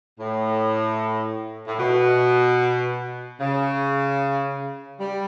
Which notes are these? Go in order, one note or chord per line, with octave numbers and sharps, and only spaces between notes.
A2
A2
B2
C#3
G3